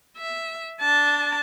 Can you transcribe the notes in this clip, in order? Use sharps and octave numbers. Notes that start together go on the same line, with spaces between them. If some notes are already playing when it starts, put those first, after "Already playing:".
E5
D4 A5